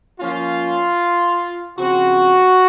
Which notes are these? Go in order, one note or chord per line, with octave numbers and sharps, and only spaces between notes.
F3 A#3 C#4 F4
C#3 F3 C4 F#4